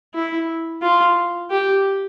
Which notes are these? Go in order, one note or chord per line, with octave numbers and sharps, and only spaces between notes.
E4
F4
G4